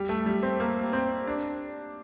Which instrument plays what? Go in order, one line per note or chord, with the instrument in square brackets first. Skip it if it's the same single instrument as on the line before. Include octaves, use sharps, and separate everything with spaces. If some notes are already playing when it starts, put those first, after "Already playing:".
Already playing: [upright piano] G3
A3
G3
C4
A#3
C4
D4